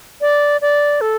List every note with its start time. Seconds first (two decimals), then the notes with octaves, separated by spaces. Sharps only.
0.21 D5
0.61 D5
1.01 A4